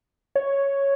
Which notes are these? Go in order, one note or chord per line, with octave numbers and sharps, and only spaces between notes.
C#5